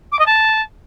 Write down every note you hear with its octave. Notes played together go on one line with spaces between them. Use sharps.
D6
D#5
A5